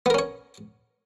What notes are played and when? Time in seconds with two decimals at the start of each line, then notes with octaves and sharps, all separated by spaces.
0.06 B3
0.10 A#4
0.14 C#4
0.19 C#5